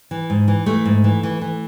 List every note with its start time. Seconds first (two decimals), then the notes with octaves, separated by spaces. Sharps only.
0.11 E3
0.30 G#2
0.48 E3
0.66 E3 A3
0.85 G#2
1.04 E3
1.23 E3
1.41 E3